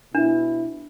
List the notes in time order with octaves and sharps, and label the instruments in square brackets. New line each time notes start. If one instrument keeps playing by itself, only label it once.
[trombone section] B2 E4 [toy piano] D4